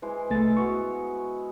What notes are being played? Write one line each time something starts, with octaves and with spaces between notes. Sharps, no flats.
E3 G#3 C5
C2 G#3 A3 E4 A6
G#3 B3 F#4 C#6